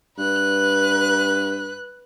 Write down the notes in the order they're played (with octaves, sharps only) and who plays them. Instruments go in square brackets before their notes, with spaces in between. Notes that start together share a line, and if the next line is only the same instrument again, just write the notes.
[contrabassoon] G2 [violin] B4 F#6